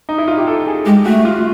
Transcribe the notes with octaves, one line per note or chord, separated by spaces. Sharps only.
D#4
E4
F4
G4
A4
G#4
G#3 G4
A3 F#4
F4